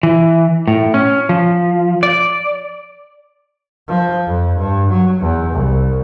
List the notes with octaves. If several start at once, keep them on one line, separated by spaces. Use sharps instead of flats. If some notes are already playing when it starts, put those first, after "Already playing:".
E3
A2
C#4
F3
D5
F3
F2
G2
F#3
E2
C2